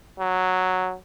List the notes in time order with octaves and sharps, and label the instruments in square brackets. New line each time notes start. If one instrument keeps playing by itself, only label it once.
[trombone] F#3